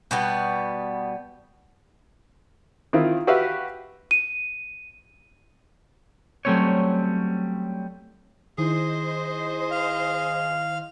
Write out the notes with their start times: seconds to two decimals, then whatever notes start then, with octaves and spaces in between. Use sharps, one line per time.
0.11 B2 G3 B3
2.93 D#3 C4 E4 F4
3.27 F#4 G4 B4 E5 F5
4.11 D#7
6.45 F#3 G3 A3 C4 C#4 C#5
8.58 D#3 E4 G#4 C5 D#5
9.71 F5